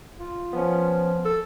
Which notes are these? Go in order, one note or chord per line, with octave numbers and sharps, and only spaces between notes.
F4
F3 B3 C#4
A4